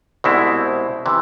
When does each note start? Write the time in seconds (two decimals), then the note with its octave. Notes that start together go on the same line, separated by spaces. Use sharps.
0.24 C2 B2 G#3 C4 E4
1.06 C3 E3